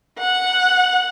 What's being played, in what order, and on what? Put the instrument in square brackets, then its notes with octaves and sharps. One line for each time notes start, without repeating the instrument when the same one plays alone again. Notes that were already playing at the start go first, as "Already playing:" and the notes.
[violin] F#5